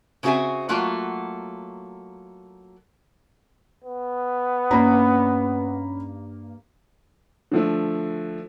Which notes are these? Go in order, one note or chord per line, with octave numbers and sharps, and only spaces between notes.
C#3 C4 F#4 G#4 E5 G#5
F#3 A3 A#3 F4 F#4
B3
G2 A#3 C#4 A#5 B5
D3 F3 A3